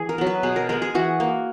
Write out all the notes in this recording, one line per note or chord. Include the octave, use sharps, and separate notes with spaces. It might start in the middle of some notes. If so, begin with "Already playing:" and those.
Already playing: E3 G#4
A#4
F#3 B3
B4
B2 G#4
A#4
G#3 B3 A#4
G#4
E3 F#4
A#3